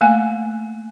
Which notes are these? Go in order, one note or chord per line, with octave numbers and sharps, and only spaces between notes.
A3 A#3 F5 G#5